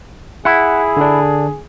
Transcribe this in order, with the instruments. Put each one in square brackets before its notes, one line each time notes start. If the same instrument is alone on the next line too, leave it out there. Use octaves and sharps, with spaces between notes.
[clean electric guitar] E4 [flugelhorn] G#4 [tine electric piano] F#5
[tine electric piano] D3 D4